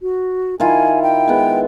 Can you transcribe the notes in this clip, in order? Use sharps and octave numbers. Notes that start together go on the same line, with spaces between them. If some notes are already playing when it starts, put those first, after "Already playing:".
F#4
D#3 E4 F4 G#5
G5
G#3 B3